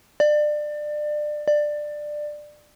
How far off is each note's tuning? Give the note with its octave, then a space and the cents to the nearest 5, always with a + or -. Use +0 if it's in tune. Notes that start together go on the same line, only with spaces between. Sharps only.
D5 +25
D5 +15